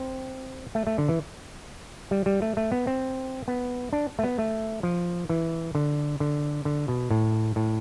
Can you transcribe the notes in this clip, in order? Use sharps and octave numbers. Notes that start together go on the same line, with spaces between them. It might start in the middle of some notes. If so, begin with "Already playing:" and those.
Already playing: C4
A3
A3
D3
E3
G3
G3
A3
A3
B3
C4
B3
D4
A3
B3
A3
F3
E3
D3
D3
D3
B2
A2
A2